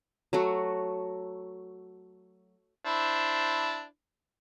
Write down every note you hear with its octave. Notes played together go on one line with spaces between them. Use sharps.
F#3 A3 F#4
D4 E4 C5